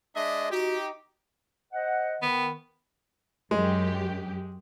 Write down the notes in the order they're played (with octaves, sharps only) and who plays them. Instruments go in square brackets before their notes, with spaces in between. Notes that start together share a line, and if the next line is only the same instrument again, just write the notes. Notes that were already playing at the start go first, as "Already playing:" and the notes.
[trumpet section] G#3 D4 D#5 [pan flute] E5
[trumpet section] D#4 G4 [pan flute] F#4
[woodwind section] C5 D#5 F#5
[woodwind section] D#3 [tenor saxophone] B3
[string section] F#2 G4 [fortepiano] G#3